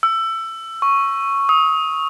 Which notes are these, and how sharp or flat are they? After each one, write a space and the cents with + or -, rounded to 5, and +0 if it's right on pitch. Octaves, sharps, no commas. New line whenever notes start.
E6 +20
C#6 +0
D#6 +30